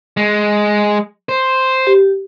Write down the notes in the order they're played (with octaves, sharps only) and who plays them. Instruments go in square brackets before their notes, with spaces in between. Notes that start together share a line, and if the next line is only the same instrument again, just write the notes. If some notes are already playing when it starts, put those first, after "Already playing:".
[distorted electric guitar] G#3
C5
[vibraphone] G4